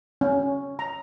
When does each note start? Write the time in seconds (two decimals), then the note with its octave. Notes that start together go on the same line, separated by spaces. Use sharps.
0.21 C#4
0.79 A#5